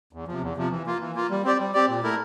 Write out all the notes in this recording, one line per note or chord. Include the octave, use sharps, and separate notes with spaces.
E2
C3 F3
E2
C3 F3
E3
A#3 F4
E3
A#3 F4
G3
C4 G4 D5
G3
C4 G4 D5
A#2
A3 E4 A#4